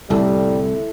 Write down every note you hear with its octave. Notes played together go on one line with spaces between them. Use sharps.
C2 A2 D3 G3 A3 E4 A4 E5